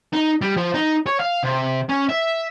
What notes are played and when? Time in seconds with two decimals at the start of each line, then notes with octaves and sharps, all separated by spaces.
0.13 D#4
0.42 G3
0.57 F3
0.74 D#4
1.06 C#5
1.20 F5
1.43 C3
1.89 C#4
2.09 E5